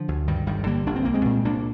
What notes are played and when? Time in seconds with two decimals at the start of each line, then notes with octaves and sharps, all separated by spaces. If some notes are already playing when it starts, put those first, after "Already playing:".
Already playing: D3 F3
0.08 D2
0.28 G2 D#3 G3
0.47 G1 D#3 G3
0.66 D3 G3 A#3
0.86 G1 D4
0.96 C4
1.05 C2 A#3
1.14 G#3 C4
1.25 A#2
1.45 C2 A#3 D4